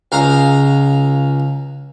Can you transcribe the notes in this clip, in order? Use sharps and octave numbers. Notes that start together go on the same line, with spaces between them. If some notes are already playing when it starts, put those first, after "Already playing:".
C#2 F5 A#5